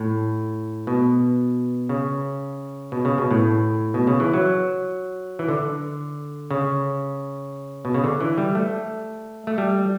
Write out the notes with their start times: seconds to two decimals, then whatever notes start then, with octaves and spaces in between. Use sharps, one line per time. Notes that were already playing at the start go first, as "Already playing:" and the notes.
Already playing: A2
0.87 B2
1.89 C#3
2.92 B2
3.05 C#3
3.18 B2
3.31 A2
3.94 B2
4.07 C#3
4.20 E3
4.34 F#3
5.39 E3
5.49 D3
6.51 C#3
7.85 B2
7.94 C#3
8.04 D3
8.21 E3
8.38 G3
8.55 A3
9.47 A3
9.58 G3